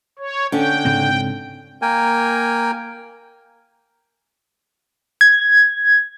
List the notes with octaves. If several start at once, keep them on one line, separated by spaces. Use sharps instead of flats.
C#5
D3 C#4 G5
G#2 C#3 C4
A#3 A#4 G5 G#5
G#6